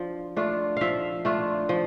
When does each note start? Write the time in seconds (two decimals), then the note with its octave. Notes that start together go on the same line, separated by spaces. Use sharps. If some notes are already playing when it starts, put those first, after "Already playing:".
Already playing: F3 D4 F4
0.36 A3 D4 F4
0.77 F3 E5 F5
1.25 A3 D4 F4
1.69 F3